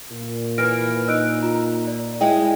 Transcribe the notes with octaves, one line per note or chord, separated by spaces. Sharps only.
A#2
E3 F6 A#6 D7
D#4 E6 F#6 D7
F4 A#5
D5
G#3 E4 D#5 G5